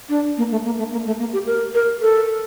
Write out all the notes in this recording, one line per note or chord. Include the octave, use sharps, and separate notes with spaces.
D4
A#3
A3
A#3
A3
A#3
A3
A#3
G4
A#4
A#4
A4